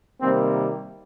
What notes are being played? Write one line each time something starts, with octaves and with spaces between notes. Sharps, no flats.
C3 D#3 G3 A#3 C4